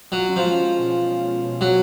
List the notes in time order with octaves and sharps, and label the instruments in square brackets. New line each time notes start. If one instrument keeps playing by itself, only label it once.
[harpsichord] F#3 [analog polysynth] F4
[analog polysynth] C#4
[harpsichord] F3
[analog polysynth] G#3
C#4
B2
G#3
C#4
B2
B2
[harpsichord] F#3 [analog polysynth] C#4